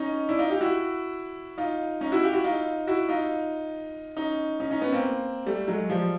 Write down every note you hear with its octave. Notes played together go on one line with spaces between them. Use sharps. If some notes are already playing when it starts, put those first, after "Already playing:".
Already playing: C#4 D#4
D4 E4
D#4 F4
F4 G4
E4 F#4
D#4 F4
C#4 D#4
E4 F#4
F4 G4
E4 F#4
D#4 F4
E4 F#4
D#4 F4
C#4 D#4
C#4 D#4
C#4 D#4
B3 C#4
A#3 C4
G3 A3
F#3 G#3
F3 G3